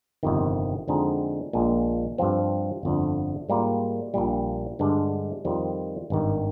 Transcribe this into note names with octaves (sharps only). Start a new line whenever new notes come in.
G1 F2 C3 D#3
F2 D3 G#3 C4 D#4
A#1 A#2 G#3
G2 F3 C4
G1 F2 D3
G#2 G3 A#3 F4
A#1 A#2 G3
G2 D3 G#3 D4
F2 D#3 G3 C4 F4
G#1 G2 D#3